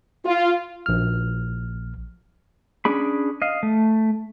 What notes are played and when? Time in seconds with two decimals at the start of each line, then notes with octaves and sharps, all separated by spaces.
0.25 F4
0.86 A#1 F6
2.85 C#4 D4 G#4 B5
3.42 D#5 F5
3.63 A3